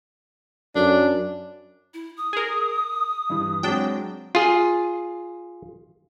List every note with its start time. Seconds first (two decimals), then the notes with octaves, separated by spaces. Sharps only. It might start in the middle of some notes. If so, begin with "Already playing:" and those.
0.76 F#2 D4
1.94 E4
2.17 D#6
2.33 G#4 A#4
3.30 G2 E3
3.63 F#3 G#3 C4 D4 G5
4.35 F4 G#4